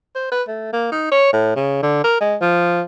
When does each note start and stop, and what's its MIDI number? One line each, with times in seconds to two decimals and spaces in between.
0.15 0.31 72
0.32 0.43 71
0.48 0.71 57
0.73 0.90 58
0.92 1.09 63
1.12 1.32 73
1.33 1.55 45
1.56 1.80 49
1.83 2.01 50
2.04 2.18 70
2.21 2.36 56
2.41 2.82 53